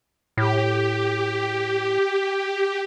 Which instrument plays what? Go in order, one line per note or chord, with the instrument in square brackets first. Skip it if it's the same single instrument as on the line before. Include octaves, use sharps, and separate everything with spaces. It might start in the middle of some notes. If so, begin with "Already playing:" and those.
[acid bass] A2 [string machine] G4